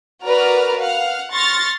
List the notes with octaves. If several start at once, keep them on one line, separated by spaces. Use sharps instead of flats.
F#4 A#4 B4 D5 A#5 F6
F5 F#5 F6
C6 C#6 F6 A6 A#6